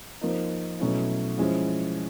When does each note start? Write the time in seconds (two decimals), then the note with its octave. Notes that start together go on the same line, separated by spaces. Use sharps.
0.21 F3 A#3 D#4
0.80 B2 F#3 A3 C#4 E4
1.38 F3 G#3 C#4 E4